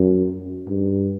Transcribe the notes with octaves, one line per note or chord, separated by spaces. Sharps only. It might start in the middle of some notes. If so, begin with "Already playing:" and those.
Already playing: F#2
G2